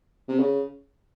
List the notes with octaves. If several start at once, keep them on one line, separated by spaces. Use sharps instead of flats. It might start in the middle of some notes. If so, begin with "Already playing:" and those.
C3
C#3